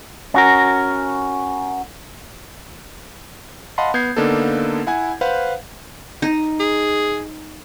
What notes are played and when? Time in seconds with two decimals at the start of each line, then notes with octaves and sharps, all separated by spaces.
0.34 C#4 F#4 A#4
3.78 D#5 F5 F#5 A5 B5 C6
3.94 B3 G6 G#6 C7
4.16 D3 A#3 B3 D4 D#4 A4
4.87 E4 F#5 G#5 G#6
5.21 B4 C5 F5 F#5
6.22 D#4
6.60 G#4